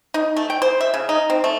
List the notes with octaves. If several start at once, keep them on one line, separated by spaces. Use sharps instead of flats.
D#4
A3
G5
C5
E5
C#3
D#4
C4
A3